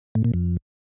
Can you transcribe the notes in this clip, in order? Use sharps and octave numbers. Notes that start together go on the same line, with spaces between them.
A2
A#2
F2